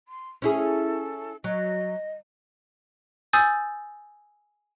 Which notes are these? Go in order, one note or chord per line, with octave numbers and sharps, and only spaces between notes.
C6
C#4 E4 G#4 A4
F#3 D#5
G#5 D#6 E6 G6 A6